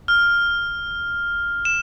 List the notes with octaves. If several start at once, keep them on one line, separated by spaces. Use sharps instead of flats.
F6
E7